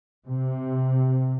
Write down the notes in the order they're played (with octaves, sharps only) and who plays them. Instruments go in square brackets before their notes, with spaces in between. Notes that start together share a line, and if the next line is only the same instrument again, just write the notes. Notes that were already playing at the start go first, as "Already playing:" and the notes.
[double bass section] C3